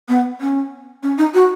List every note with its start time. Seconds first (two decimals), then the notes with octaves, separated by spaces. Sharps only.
0.09 B3
0.41 C#4
1.03 C#4
1.18 D#4
1.34 F#4